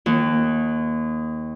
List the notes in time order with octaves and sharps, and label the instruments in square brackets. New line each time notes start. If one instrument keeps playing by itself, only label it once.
[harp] D#2